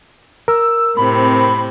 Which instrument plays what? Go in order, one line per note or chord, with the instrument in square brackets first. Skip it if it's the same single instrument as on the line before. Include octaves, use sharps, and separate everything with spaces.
[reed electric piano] A#4 [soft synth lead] E6
[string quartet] A2 C3 C4 [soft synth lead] B5